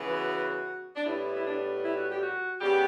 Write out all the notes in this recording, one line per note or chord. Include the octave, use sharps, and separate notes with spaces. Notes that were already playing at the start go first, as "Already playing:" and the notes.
Already playing: C#3 E3 B3
F#4
D4
A2 G3 B3 E4
E4
D4
E4
F#4
G4
F#4
C#3 G3 B3 G4